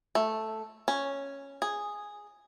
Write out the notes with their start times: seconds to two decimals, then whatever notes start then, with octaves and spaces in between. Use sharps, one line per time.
0.15 A3
0.88 C#4
1.62 G#4